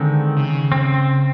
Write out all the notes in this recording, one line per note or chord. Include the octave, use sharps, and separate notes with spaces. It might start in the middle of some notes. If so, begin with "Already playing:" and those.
Already playing: D3 D#3 G#3 C4 D#4
C#3
C4